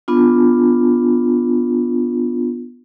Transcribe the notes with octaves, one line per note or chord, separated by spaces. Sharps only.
B3 D4 F4